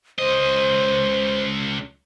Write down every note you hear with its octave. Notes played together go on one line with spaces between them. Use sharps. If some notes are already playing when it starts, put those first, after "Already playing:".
C#2 C5 D#5